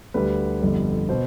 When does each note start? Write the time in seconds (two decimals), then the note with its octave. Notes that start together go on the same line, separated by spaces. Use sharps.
0.14 D2 D3 G3 B4
0.61 G1 F2 D3 G3
1.09 B2 C5